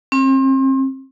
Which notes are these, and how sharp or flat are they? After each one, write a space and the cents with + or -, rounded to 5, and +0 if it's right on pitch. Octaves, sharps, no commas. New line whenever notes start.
C4 +35